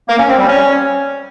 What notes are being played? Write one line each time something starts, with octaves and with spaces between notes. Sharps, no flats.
A#3
C#4
C4
G3
C#4